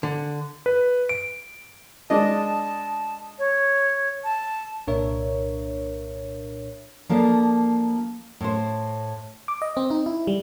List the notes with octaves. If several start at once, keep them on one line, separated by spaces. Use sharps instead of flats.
D3
B4
D7
G#3 D4 D#5 A5
C#5
A5
C2 A#2 D4 A#4 C#5 E5
F3 A#3 D4 A4
A2 C5
D6
D#5
C4
D#4
E4
G3